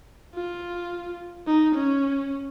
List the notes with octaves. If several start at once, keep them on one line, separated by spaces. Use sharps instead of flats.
F4
D#4
C#4